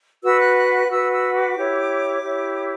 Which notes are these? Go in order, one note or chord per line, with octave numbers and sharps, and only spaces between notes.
F#4 B4 E6
F#6
F#6
F#6
F#4 B4 E6
E6
D6
E4 G4 C#5
E4 G4 C#5